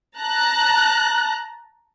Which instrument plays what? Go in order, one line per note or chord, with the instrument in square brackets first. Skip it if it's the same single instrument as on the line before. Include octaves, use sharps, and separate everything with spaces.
[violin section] A5 A#5 F#6